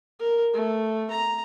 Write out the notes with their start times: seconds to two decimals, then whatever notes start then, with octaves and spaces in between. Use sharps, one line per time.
0.19 A#4
0.54 A3
1.11 A#5